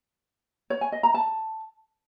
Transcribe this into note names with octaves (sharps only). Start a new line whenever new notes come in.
C#5
G#5
D#5
A#5
A5